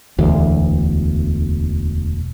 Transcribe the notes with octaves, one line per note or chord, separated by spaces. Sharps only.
E1 D2